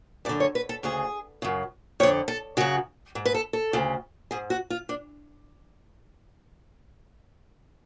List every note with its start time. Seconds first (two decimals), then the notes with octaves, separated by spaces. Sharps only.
0.25 F#2 D5
0.29 D3
0.40 C#5
0.55 B4
0.69 A4
0.83 D2 C#3 G#4
1.42 F#2 C#3
2.00 F2 D3 C#5
2.28 A4
2.57 F#2 C#3 F#4
3.15 G#2
3.25 B4
3.35 A4
3.53 A4
3.73 D2 C#3
4.31 G#2 G#4
4.50 F#4
4.70 F4
4.89 D4